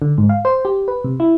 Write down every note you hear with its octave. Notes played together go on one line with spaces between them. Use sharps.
D3
G#2
F5
C5
G4
B4
C3
E4